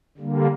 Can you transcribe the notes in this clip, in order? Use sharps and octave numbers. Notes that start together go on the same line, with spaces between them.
D3 G3 A#3